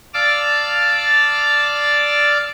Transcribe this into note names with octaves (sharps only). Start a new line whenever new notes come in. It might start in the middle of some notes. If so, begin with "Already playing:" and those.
D5 F5 A5 D6 E6 F6